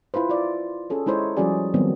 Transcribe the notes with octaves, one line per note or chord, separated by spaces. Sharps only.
E4 F4 B4 C5
F4 D5
C#4 G#4 A4 C#5
G#3 D#4 E4 C5 C#5
F3 G3 C#4 F#4 G#4 D5
D#3 F#3 G3 B3 C4